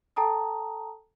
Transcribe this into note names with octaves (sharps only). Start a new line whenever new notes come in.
A4 G5 A5 A#5 D#6